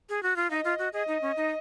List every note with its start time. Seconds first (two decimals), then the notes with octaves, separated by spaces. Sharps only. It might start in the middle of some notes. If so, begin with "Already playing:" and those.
0.09 G#4
0.23 F#4
0.36 F4
0.50 D#4 D#5 F5
0.64 F4
0.78 F#4
0.93 G#4 D#5
1.08 D#4
1.22 C#4
1.37 D#4